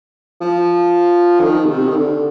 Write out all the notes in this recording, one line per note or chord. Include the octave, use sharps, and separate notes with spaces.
F3
D3
D#3
B2
C3
D#3
D3